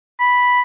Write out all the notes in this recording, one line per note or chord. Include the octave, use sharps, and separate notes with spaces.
B5